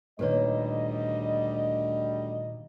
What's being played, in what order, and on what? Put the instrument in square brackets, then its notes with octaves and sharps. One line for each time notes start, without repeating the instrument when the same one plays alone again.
[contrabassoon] D2 [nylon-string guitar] A#2 D#3 [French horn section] G3 D#5 [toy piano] A4 B4 C#5